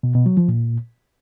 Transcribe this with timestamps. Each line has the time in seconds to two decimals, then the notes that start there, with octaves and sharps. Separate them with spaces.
0.03 B2
0.15 B2
0.26 F#3
0.37 F3
0.48 A#2